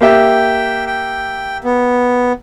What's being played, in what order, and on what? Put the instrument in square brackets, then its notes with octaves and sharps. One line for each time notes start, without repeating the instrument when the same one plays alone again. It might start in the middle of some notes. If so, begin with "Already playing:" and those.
[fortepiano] A#3 G4 E5 [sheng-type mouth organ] G5
[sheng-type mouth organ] G5
B3